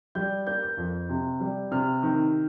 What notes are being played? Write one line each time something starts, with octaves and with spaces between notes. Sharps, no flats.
G3 G6
A#3 G6
G6
F2
C3
G3
C3 F6
D#3